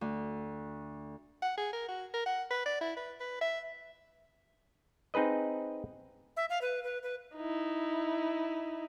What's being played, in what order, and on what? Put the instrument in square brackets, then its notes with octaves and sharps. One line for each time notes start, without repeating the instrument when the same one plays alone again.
[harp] D2
[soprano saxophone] F#5
G#4
A#4
F#4
A#4
F#5
B4
D5
E4
B4
B4
E5
[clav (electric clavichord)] C4 D#4 G#4 B4 D#5
[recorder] E5
F5
B4
B4
B4
[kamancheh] D#4 E4